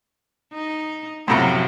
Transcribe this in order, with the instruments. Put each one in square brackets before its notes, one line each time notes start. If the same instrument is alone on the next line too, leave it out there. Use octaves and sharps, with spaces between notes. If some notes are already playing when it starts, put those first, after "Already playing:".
[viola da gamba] D#4
[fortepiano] F#2 A2 A#5 [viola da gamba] C3 F3 F#3